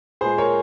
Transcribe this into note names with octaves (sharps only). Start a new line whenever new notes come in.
A#2 G#3 G#4 C5
A#4 C#5